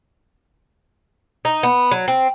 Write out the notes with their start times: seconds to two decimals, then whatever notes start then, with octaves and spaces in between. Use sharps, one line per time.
1.45 D#4
1.63 B3
1.91 F#3
2.08 C4